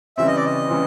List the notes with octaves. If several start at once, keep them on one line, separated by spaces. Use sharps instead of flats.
C#3 E3 G3 C4 E5
D#5
D5
D#5
C#3 E3 G3 C4